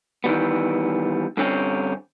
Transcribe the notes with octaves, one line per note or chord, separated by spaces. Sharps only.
D#3 E3 G3 B3
G2 D3 C4 C#4